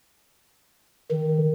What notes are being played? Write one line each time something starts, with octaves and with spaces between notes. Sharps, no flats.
D#3